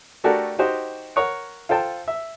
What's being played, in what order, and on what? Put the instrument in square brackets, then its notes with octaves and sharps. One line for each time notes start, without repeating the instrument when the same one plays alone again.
[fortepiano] A3 D4 F#4 G4 A4 A#4
D#4 F#4 G4 C5
A#4 C#5 F#5
F4 A4 C5 G5 A5
E5